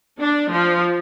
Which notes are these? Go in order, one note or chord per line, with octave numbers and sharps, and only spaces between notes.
D4
F3